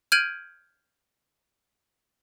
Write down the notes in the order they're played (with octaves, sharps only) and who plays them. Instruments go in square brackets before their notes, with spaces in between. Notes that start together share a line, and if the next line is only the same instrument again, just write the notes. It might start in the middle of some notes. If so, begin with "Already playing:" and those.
[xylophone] F6 G6 G#6 D7 D#7 F#7